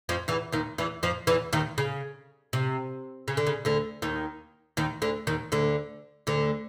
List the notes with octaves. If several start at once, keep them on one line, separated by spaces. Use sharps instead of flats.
F2 F3
E2 E3
D#2 D#3
E2 E3
F2 F3
E2 E3
D#2 D#3
C#3
C3
C#3
D3
C#3
D2 D3
D#2 D#3
D#2 D#3
D2 D3
D#2 D#3
D2 D3
D2 D3